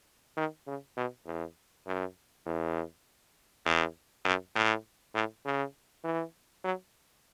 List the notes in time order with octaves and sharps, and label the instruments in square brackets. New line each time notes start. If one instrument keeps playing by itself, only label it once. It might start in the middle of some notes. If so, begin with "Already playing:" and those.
[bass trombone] D#3
C#3
B2
E2
F#2
E2
E2
F#2
A2
A2
C#3
E3
F#3